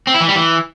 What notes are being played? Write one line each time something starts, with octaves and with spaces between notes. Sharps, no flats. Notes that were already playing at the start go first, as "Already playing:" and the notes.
C4
E4
E3
G3
E3